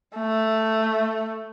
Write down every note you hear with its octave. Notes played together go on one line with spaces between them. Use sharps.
A3